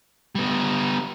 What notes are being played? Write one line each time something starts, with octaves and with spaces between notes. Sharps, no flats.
G3 B3